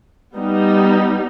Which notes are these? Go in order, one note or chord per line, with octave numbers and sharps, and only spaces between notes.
G3 B3 D#4